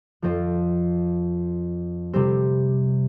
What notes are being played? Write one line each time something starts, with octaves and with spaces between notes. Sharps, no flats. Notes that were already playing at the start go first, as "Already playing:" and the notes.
F2 F3 C4 F4
C3 G3 C4 G4